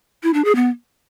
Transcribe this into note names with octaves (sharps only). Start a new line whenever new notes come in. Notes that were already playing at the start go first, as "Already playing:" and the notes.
E4
D4
G#4
B3